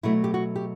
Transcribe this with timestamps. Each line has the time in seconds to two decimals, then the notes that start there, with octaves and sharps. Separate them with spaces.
0.03 B2 F#3 A3 E4
0.24 G4
0.34 F#4
0.56 G4